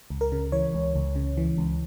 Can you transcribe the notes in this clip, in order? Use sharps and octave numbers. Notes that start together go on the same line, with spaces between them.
C#2
A#4
C#3
E3 C#5
C#2
C#2
C#3
E3
C#2